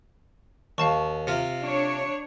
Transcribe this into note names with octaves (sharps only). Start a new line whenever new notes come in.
D#2 F5 A5 C#6
C3 F4
D4 C#5